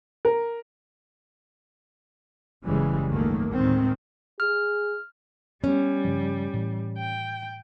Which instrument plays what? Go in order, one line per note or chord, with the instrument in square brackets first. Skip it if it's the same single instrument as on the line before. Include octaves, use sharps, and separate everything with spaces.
[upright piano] A#4
[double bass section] F#1 C#3 E3 G3 G#3
C#2 G#2 D#3 F#3 A3 A#3
D2 A2 D#3 G#3 C4
[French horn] G#4 [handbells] F6
[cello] G3 [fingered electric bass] B3 [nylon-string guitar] C#4
[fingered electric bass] G2 C#3 F3
A2 E3
[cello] G5